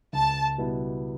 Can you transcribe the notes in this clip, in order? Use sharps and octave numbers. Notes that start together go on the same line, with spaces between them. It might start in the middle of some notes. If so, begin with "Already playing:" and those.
C#2 A5
B2 G3 B3 E4